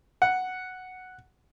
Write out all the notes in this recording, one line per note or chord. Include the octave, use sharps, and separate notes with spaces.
F#5